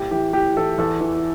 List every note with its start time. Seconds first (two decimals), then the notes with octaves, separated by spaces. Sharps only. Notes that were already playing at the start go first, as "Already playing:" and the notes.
Already playing: A2 G4
0.11 E3 G4
0.33 A2 G4
0.57 E3 A4
0.78 E2 A4
1.01 E3